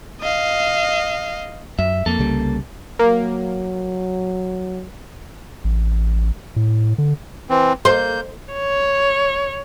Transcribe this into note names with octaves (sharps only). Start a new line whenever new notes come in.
D#5 F5
F#2 E5
F2 A#3 A4
C2 C#3 G3
F#3 A#3
A1
A2
D3
E3 C4
A#3 C5 G6
C#5